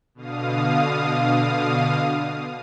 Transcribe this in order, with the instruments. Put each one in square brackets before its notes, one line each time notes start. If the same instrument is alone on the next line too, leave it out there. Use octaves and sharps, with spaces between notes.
[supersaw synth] B2 D3 F5 D#6